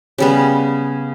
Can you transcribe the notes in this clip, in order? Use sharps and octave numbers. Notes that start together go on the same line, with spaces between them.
C#3 G3 B3